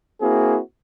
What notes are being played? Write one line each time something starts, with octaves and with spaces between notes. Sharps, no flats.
A#3 C4 E4 F#4 G#4